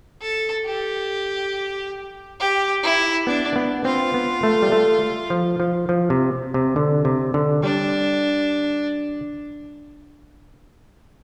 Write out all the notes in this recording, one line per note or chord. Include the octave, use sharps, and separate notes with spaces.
A4
G4
G4
E4
B3 D4
B3
C4 F4
B3
A3
G3
A3
F3
F3
F3
C3
C3
D3
C3
D3
G3 D4